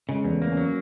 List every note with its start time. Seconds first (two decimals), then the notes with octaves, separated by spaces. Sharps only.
0.09 C#3 G#3
0.24 E2
0.31 A3
0.42 A#3
0.52 C#4
0.57 F#3